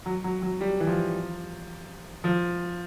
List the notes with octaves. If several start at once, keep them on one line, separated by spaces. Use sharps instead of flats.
F#3
F#3
F#3
G3
E3
F3
F3